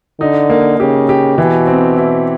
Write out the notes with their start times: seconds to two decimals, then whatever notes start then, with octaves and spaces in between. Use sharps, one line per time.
0.20 D3 D#4
0.50 A#3
0.79 C#3 G4
1.09 G4
1.38 B2 E3
1.67 C4
1.97 E4